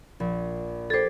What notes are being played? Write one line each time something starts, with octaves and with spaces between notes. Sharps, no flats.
A#1
G4 A4 C5 G#6 A6